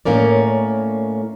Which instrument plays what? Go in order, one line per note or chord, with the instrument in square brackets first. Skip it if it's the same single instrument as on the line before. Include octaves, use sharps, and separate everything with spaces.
[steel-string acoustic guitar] A2 A#3 C#4 A#4 D5